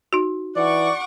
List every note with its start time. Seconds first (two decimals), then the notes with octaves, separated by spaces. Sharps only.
0.13 D#4 F#4
0.56 E3 D5 F#5 C#6 D6